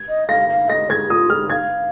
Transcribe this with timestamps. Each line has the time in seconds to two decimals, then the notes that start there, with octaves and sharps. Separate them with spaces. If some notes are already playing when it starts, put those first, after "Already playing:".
Already playing: G#6
0.09 D#5
0.28 F5 A#6
0.49 F5
0.69 D#5 A#6
0.90 G#4 G#6
1.10 F4 D#6
1.30 G#4 F6
1.50 F5 G#6